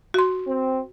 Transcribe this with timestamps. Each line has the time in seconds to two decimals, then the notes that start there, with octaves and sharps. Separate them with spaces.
0.14 F#4 C6
0.47 C4